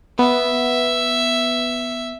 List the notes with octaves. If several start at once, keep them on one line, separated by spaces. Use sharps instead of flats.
B3 E5